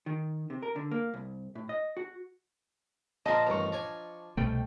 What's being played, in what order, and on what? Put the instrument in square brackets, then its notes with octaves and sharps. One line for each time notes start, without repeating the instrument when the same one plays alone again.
[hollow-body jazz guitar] D#3
C3
A#4
D3
A#3
C2
A2
D#5
F#4
[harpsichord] A#2 A#3 [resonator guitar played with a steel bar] F3 D#5 [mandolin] A5 A#5
[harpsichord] A1 G2 D#3 [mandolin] A#5 C#6
[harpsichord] D4 C#5 G#5
[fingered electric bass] C2 B2 A3 [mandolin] G5